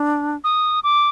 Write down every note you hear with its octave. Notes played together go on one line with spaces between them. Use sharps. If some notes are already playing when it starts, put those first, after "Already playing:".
Already playing: D4
D#6
D6